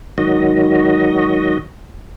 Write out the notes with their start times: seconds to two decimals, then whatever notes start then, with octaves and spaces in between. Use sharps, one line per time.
0.18 G#2 D#3 F#3 F#4 D#5